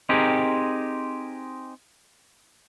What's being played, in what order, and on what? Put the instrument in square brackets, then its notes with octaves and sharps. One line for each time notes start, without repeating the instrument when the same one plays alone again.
[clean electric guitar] C4 D#4 G4 G#4 A#4